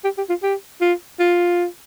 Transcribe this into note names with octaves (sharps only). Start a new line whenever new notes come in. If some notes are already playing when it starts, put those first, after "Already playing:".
G4
G4
F4
G4
F4
F4